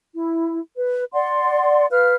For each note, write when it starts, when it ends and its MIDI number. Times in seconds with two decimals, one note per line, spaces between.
0.14 0.59 64
0.75 1.04 71
1.13 1.86 74
1.13 1.86 78
1.13 1.86 84
1.91 2.15 71
1.91 2.15 77
1.91 2.15 89